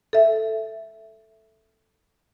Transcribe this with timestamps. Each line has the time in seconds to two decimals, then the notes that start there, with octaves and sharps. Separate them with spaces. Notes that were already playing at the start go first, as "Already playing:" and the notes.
0.13 A4 E5